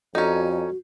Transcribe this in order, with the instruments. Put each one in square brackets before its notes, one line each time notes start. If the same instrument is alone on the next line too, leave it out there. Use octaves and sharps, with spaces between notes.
[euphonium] F2 [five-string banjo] C#4 D#4 [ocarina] F#4 [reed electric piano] A4 D5 A#5